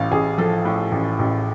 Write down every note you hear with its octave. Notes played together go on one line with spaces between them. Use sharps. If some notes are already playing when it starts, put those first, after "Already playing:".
Already playing: A1 A2 F5
A1 G#4
F3 A4
A2
A1
A1